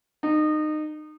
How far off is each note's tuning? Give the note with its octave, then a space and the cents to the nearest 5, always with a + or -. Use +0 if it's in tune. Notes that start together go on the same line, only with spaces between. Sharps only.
D#4 -25